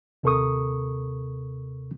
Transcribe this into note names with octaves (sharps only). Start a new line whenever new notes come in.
D#2 C3 A4 A#4 C#6 D#6